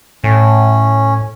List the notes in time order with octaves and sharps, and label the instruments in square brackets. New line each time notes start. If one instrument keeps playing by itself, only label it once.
[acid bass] A2 [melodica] C#4